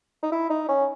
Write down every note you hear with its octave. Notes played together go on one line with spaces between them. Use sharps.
D#4
E4
D#4
C#4